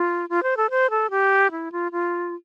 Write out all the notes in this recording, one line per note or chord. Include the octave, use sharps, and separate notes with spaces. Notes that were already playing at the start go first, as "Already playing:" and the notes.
Already playing: F4
F4
C5
A4
C5
A4
G4
E4
F4
F4